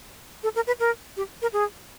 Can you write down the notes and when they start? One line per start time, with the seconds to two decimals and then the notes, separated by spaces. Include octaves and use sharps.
0.43 A4
0.56 A#4
0.67 B4
0.80 A#4
1.17 G4
1.42 A#4
1.53 G#4